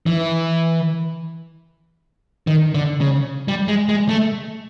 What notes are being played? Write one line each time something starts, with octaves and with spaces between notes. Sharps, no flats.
E3
D#3
D3
C#3
G3
G#3
G#3
A3